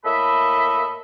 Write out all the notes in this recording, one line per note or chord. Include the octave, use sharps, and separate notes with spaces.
A2 A#3 A4 D#5 E5 B5